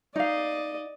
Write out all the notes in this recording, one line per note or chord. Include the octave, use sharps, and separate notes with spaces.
D#4 D5 D#5 F5